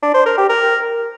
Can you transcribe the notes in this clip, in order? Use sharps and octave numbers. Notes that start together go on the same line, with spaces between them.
D4
C5
A#4
G4
A#4